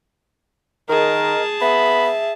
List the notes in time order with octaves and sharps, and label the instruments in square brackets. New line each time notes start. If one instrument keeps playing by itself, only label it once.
[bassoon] D#3 [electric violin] G#4 A5 [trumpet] A#4 [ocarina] D#5
[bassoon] B3 [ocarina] E5 [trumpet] B5